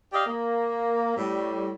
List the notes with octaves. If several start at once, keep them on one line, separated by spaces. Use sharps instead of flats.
G4 D5 D#5 F5
A#3
A2 G3